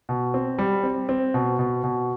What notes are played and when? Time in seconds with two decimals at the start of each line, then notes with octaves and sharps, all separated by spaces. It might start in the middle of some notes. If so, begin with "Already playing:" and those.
0.09 B2
0.34 C4
0.58 G3
0.83 C4
1.09 C4
1.34 B2
1.59 B2
1.84 B2